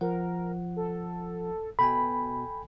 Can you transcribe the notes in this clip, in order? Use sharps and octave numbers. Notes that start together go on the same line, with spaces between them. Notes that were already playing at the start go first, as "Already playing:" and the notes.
F3 A#4 F#5
A4
B2 A4 G5 G#5 B5